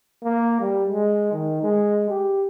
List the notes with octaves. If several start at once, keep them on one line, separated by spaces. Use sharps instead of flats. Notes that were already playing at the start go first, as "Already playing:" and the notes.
A#3
G3
G#3
D#3
G#3
G4